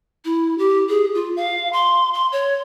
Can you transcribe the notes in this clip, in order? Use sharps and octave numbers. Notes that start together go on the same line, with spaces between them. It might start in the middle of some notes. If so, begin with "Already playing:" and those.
E4
G4
G#4
F4
F5
C6
C6
C#5